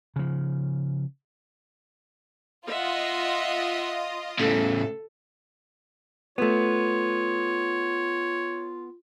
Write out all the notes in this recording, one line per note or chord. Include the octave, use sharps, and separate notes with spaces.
C#3 F3
F4 D#5 E5 F#5
A2 C#3 A4
A3 B3 F4 C#5